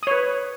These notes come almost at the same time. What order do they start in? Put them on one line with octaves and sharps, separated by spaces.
D#6 C#5 B4